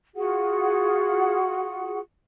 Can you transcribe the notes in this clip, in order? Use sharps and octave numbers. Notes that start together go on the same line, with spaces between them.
F4 F#4 G#4 F#5